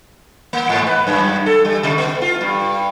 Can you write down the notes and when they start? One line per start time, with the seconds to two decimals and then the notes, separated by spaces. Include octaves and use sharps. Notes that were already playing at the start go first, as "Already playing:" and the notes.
0.53 A#3
0.69 G#2
0.87 B4
1.07 F#2
1.46 A4
1.65 G3
1.83 C3
1.98 B3
2.22 F4
2.41 G2